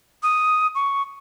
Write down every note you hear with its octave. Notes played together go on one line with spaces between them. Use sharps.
D#6
C#6